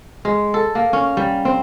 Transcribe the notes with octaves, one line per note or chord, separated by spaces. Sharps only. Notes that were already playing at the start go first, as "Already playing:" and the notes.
G#3
A4
A#3
C#4
G3
C4